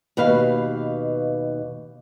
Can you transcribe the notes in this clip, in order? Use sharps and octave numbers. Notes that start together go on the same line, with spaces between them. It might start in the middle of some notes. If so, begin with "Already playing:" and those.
D#2 B2 B4 F5